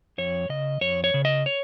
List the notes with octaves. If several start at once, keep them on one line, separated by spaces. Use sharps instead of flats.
F2 C#5
C#3 D#5
F2 C#5
C#5
C#3
D#5
C#5